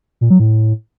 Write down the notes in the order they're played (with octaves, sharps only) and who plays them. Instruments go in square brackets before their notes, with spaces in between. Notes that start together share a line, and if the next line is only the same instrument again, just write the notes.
[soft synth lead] A#2
F#3
A2